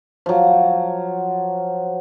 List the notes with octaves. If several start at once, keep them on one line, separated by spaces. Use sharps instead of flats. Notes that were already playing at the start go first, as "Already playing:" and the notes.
F3 F#3